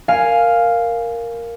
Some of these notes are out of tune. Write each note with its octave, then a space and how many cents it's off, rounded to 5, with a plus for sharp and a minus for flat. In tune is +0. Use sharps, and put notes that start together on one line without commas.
A#4 +0 F5 +0 G#5 +0